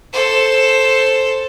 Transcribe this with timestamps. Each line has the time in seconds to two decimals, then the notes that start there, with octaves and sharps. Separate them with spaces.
0.13 A4 C5